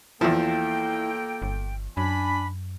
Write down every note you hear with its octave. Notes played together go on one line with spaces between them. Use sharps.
E2 F3 A#3 E4 A4 G5
G1
F#2 D4 G#5 B5